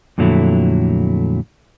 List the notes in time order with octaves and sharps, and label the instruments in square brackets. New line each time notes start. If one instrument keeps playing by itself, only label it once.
[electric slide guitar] F2 A#2 D3 F#3 A3 E4